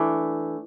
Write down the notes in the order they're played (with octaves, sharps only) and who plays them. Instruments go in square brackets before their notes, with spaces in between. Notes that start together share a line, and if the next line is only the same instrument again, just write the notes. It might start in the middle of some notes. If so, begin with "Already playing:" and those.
Already playing: [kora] E3 A3 D4